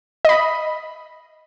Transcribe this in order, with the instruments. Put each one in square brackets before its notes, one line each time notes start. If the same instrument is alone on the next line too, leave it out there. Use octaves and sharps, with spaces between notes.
[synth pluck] D#5 B5